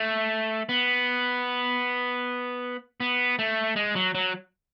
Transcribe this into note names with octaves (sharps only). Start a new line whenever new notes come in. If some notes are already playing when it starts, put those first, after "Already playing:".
Already playing: A3
B3
B3
A3
G#3
F#3
F#3